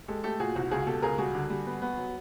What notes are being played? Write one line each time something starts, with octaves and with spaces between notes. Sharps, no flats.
G#3 G4 A4
A3 G4 A4
A#2 F#4 G#4
C2 F#4
C#2 F#4 G#4
B2 G4 A4
C#2 G#4 A#4
G3 F#4 G#4
D3
G3
B3
B3
F#3